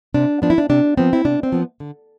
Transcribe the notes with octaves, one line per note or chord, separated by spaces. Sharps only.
C3 D4
F3 B3 D4
E4
D4
C3 D4
F3 B3 C4
E4
C3 D4
C4
F3 B3
D3